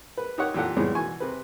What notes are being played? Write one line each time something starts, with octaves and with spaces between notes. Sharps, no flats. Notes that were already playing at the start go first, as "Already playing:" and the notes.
B4
D#4 G4 C#5 F#5
A#2 E3 G4 A4 F#5
A2 C#3 E3 G3 G#3 B3
B2 E3 G#5 C#6
C3 B4